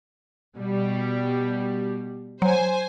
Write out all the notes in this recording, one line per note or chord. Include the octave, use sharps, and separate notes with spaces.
B2 G3
F#3 C5 G#5